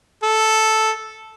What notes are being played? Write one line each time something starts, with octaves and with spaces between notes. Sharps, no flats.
A4